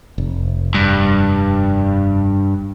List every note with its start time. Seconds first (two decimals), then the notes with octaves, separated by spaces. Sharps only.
0.18 F1
0.74 G2